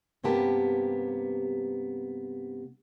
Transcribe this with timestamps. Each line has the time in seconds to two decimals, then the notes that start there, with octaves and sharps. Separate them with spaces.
0.24 G2 C3 A#3 B3 G4 A5